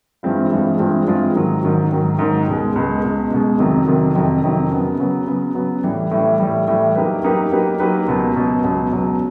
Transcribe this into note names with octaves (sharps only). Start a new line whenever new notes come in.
G2 E3 G#3 C4 F4
G2 E3 G#3 C4 F4
G2 E3 G#3 C4 F4
G2 E3 G#3 C4 F4
G#2 D#3 F#3
G#2 D#3 F#3
G#2 D#3 F#3
G#2 D#3 F#3
C#2 B2 G#3
C#2 B2 G#3
C#2 B2 G#3
C#2 B2 G#3
F2 C3 D#3 F#3
F2 C3 D#3 F#3
F2 C3 D#3 F#3
F2 C3 D#3 F#3
C#3 F#3 B3
C#3 F#3 B3
C#3 F#3 B3
C#3 F#3 B3
A2 E3 G3
A2 E3 G3
A2 E3 G3
A2 E3 G3
F#3 A#3 D#4 G4 B4
F#3 A#3 D#4 G4 B4
F#3 A#3 D#4 G4 B4
F#3 A#3 D#4 G4 B4
C#2 B2 F#3
C#2 B2 F#3
C#2 B2 F#3
C#2 B2 F#3